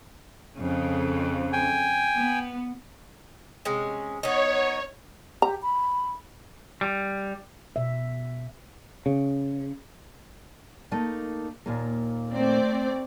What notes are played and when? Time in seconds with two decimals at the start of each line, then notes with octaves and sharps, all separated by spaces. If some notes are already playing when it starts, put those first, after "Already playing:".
0.57 F2 C#3
1.53 G5 G#5
2.17 B3
3.65 C3 G#3 C#4
4.23 B3 D#4 C#5
5.42 G4 A#5
5.63 B5
6.81 G3
7.76 B2 E5
9.06 C#3
10.91 A3 A#3 D#4
11.66 D#2 A#2 A#3
12.31 A3 C4 D5